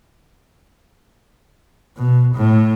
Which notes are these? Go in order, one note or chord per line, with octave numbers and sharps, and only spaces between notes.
B2
A2